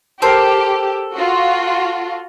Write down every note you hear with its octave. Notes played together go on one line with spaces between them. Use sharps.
G4 A4 A#4 C5
F4 F#4